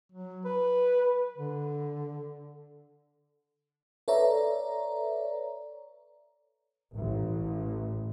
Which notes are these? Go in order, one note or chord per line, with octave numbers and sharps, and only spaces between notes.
F#3
B4
D3
A4 B4 C#5 D5 E5 A#5
A1